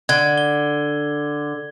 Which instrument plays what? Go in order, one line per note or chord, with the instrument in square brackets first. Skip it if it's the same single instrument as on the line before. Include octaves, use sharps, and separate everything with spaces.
[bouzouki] D3 [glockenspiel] G#6
[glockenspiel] G7